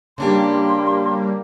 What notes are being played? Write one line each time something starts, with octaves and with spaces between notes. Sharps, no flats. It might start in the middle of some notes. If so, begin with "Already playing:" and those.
C#3 G3 A#3 D4 G4 C6